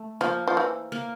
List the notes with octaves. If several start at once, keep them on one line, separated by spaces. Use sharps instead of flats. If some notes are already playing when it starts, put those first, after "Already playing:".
Already playing: A3
F3 A#3
F3
E3
A#3